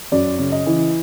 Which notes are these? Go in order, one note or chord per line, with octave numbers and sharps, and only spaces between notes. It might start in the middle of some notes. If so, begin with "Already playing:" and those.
F#2 D5
C#3
D#5
E3